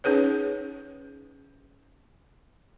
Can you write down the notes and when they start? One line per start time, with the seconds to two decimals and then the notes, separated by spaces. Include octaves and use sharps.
0.04 C#4 D#4 G#4 B4 C#5